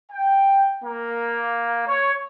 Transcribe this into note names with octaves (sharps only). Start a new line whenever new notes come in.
G5
A#3
C#5